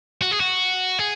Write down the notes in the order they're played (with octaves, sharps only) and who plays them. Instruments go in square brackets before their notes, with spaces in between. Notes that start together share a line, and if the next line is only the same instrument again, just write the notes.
[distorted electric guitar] F#4
G#4
F#4
G#4